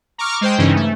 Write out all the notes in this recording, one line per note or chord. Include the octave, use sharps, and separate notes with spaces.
A#5 C#6 D6 F6
G#3 C5 G5
G2 C#3 E3 C#4 D#4
A3